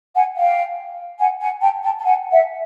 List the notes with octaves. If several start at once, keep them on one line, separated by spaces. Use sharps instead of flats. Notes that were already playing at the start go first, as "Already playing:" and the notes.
F#5 G#5
F5 G5
F#5 G#5
F#5 G#5
G5 A5
G5 A5
A5
F#5 G#5
E5 F#5